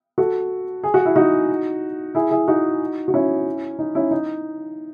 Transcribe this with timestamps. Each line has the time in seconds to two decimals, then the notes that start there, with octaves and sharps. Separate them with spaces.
0.18 F#4 A4
0.84 G#4
0.94 F#4
1.05 E4
1.16 D#4 F#4
2.15 E4 G#4
2.31 E4 G#4
2.48 D#4 F#4
3.08 F#4
3.14 C#4 E4
3.79 D#4
3.95 C#4 E4
4.11 D#4